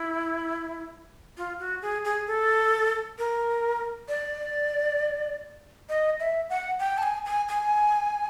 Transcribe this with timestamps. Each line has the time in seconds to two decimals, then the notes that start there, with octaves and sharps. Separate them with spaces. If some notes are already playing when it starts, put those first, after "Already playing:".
Already playing: E4
1.37 F4
1.60 F#4
1.82 G#4
2.04 G#4
2.27 A4
3.18 A#4
4.08 D5
5.89 D#5
6.20 E5
6.50 F#5
6.80 G5
6.98 A5
7.03 G#5
7.26 G#5
7.48 G#5